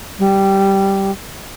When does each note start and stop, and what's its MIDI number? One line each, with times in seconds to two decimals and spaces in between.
0.19 1.11 55